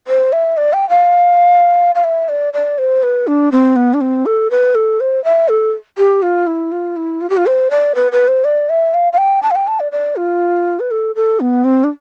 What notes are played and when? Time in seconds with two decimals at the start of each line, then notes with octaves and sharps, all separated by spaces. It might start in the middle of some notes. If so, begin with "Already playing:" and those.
0.07 C5
0.32 E5
0.57 D5
0.73 G5
0.89 F5
1.95 F5
2.04 E5
2.29 D5
2.53 D5
2.78 C5
3.03 B4
3.27 D4
3.52 C4
3.76 B3
3.94 D4
4.01 C4
4.26 A4
4.51 B4
4.75 A4
5.00 C5
5.24 E5
5.48 A4
5.98 G4
6.22 F4
6.47 E4
6.72 F4
6.96 E4
7.21 F4
7.30 G4
7.37 F4
7.46 C5
7.71 D5
7.95 B4
8.12 B4
8.28 C5
8.44 D5
8.69 E5
8.94 F5
9.13 F5
9.18 G5
9.43 A5
9.51 F5
9.55 G5
9.67 A5
9.80 D5
9.92 D5
10.16 F4
10.80 B4
10.91 A4
11.15 A4
11.40 B3
11.64 C4
11.84 D4